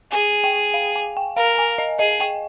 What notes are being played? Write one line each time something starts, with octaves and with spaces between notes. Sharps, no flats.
G#4 G#5
G5
F5
G#5
G5
A#4 F5
G#5
D#5
G#4 D#5
G5